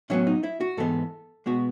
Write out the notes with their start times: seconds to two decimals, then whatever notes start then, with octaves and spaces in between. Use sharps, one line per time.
0.10 A2 F#3 B3 C#4
0.27 D#4
0.43 E4
0.61 F#4
0.77 G#2 E3 G#3 B3 A4
1.46 B2 G#3 B3 F#4